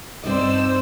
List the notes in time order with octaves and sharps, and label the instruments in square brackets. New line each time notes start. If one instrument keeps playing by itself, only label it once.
[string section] G2 E6 [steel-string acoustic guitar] C4 D#4 D#5 [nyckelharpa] C5 D5